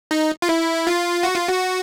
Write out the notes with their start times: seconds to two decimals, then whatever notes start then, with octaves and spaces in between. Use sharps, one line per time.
0.11 D#4
0.42 F4
0.49 E4
0.87 F4
1.23 F#4
1.36 F4
1.49 F#4